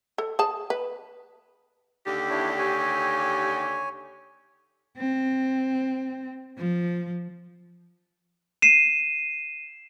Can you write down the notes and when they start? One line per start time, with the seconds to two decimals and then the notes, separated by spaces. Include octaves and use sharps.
0.18 A4
0.39 G#4 A5
0.70 B4
2.06 D#2 D3 G4
2.30 D4 E4 C#5
2.59 C#5 G#5
4.98 C4
6.58 F3
8.62 C7 D#7 E7